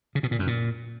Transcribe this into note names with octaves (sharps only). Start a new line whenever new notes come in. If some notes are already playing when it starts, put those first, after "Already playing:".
C#3
B2
A#2
F#2
A#2